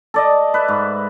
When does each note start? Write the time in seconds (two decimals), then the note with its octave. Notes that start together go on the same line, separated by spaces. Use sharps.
0.14 A4 D5 D#5
0.54 B4 E5
0.68 G#2